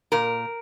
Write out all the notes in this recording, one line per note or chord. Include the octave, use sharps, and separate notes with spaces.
A#2 A#4